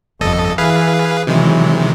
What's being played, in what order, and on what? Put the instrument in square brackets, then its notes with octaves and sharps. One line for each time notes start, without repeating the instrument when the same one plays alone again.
[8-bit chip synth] G1 A4 D#5 [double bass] F2
[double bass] E3 [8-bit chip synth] G#4 B4 F5
[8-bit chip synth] C3 D#3 G#3 [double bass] E3 F#3